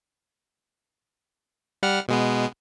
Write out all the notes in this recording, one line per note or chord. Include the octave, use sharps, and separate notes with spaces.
G3 F#5 F6
B2 G#3 B3